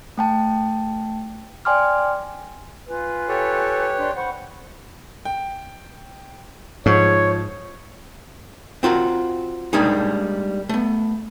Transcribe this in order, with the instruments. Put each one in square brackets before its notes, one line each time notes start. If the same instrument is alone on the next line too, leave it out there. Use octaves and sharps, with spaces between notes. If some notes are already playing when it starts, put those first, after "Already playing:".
[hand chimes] A3 G5 A5
D5 G5 G#5 C6 D6 F6
[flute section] F4 G#5 [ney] B4
[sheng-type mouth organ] G4 C#5 [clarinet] A4
[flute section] D4 C6
[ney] C5 [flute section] F#5 B5 C#6
[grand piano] G5
[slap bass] G#2 [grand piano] F3 [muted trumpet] C#5
[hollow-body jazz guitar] C4 F4 F#4 A#4
G3 G#3 A#3 D4 D#4
A3 B3